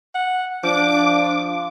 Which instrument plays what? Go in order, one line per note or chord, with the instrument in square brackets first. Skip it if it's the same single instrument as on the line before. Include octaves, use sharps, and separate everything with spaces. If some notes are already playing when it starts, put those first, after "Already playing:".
[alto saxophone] F#5
[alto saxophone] F3 [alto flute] D4 [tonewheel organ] D6